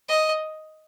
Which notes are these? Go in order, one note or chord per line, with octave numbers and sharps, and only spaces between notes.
D#5